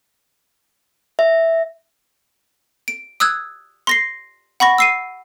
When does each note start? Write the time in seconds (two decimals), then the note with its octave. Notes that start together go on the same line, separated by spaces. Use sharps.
1.19 E5
2.88 D7
3.20 D#6 E6 F#6 G#6
3.87 C6 A#6 C7
4.60 F#5 B5 C#6 A#6
4.78 E6 C7 D#7